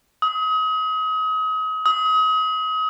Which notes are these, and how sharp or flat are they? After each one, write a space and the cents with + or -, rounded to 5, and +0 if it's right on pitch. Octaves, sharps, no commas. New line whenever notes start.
D#6 +35
D#6 +35